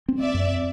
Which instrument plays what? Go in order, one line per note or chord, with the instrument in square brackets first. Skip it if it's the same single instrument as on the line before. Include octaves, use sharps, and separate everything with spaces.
[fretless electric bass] C4
[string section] D5 E5
[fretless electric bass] F#2